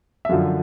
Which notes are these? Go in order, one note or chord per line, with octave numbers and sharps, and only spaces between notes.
E5
F#2 D3 F3 F5